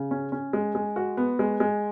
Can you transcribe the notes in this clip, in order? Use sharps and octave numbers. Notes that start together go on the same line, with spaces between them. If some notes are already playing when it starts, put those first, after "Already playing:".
Already playing: C#3
C#4
C#4
G#3
G#3
F#4
B3
G#3
G#3